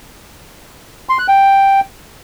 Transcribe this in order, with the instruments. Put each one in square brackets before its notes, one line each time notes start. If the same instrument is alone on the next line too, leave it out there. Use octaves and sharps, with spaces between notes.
[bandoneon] C6
F#6
G5